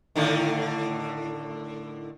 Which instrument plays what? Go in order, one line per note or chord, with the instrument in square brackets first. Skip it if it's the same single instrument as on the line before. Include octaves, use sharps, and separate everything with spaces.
[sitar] A2 D3 D#3